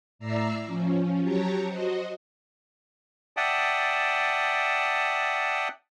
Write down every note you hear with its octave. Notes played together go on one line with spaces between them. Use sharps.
A2 D5 E5 A#5 E6 C7
F3 C#4
F#3 G4 C#5 A5 A#5
F#4 C5 D#5
D5 E5 F#5 G5 A5 D#6